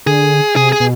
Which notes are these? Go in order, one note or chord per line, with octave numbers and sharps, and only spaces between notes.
D3 G#4
C3 G#4
G#4
B2